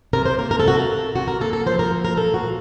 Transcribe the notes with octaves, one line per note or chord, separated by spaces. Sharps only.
C3 A#4
C5
A#3 A#4
A#4
A4
C3 F#4
A4
C3
C3 F#4
A#4
A#3 A4
A4
F3 C5
A#4
A#3
A#4
A#2 A4
F#4
A#2